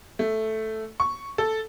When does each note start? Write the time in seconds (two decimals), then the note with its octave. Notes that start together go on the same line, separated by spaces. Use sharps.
0.19 A3
1.00 C#6
1.38 A4